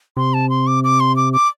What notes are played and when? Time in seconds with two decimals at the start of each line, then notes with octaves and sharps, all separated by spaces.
0.17 C3 C6
0.34 A5
0.50 C6
0.67 D6
0.84 D6
1.00 C6
1.16 D6
1.33 D6